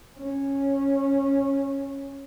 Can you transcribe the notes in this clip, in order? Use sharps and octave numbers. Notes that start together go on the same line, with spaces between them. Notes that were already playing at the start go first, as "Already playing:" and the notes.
C#4